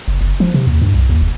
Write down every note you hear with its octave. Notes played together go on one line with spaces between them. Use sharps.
F#1
F#1
F3
C3
D#2
G2
C2
D#2
F1